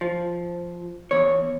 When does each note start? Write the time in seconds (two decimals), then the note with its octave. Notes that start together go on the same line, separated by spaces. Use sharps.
0.01 F3
1.11 E2 C#5